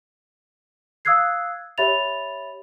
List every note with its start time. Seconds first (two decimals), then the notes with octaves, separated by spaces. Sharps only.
1.05 F5 D#6 E6 F#6 G#6 C7
1.78 G4 C#5 E5 B5 A6 F7